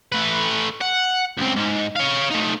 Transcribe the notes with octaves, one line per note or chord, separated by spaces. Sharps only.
A3 B4
F#5
C#2 C4
G#2
C#5 F5
A3 D#4